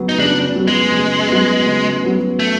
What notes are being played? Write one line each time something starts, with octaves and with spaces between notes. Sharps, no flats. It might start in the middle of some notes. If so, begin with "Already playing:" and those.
Already playing: C#3 F#3 B3
D#4
C#3 D4
F#3 B3
G#3
C#3
F#3 B3
C#3
F#3 B3
A3